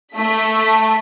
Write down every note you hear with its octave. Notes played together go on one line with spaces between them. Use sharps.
A3 B6